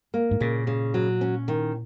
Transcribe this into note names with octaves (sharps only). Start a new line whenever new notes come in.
A#3
G#2
A#2 C#3
C#3
F#3
C#4
D#3